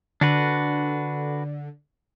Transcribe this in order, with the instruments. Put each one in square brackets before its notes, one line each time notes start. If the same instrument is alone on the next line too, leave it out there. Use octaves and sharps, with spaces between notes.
[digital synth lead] D3 [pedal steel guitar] D4 F#4 B4